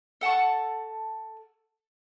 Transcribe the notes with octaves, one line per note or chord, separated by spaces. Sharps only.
A4 F#5 A5 C#6